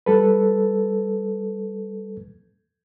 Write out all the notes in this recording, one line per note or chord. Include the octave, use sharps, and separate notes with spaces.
G3 A4 B4